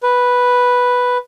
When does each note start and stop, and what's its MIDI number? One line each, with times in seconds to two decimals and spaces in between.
0.03 1.17 71